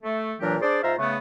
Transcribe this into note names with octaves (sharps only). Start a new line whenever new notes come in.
A3
A#2 E3 F#3 D4 G4 A#4
D4 G#4 C5 D5
G#2 F4 C5 E5 F5 A#5
C#3 A3 B3